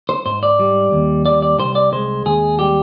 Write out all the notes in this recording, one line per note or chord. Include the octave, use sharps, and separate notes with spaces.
C5
G#2 C5
D5
G3
D#2
G3 D5
D5
C2 C5
D5
G#3 C5
D#2 G#4
G3 G4